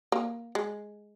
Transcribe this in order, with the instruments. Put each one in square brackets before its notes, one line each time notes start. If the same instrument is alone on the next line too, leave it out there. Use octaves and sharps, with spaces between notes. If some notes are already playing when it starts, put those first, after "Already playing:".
[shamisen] A#3
G#3